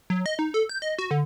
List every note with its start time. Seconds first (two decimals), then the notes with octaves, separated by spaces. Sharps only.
0.10 F#3
0.26 D#5
0.39 D#4
0.54 A4
0.69 G6
0.82 D#5
0.99 F#4
1.11 D3